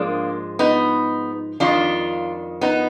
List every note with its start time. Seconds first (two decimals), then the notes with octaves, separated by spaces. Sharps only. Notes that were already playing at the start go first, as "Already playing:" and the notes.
Already playing: G#2 F3 G#3 A#3 D4
0.59 B3 D#4
1.60 F2 D#3 G#3 D4 F4
2.61 B3 D#4